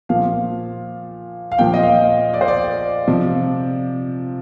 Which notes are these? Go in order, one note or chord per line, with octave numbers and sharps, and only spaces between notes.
A#2 F3 F5
F5
A#2 F3 G5
D#5
F5
D5
C5
D5
C3 F3